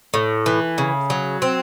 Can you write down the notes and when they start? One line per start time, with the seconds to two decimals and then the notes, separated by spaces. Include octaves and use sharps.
0.14 A2
0.46 E3
0.78 C#3
1.10 F#3
1.42 C4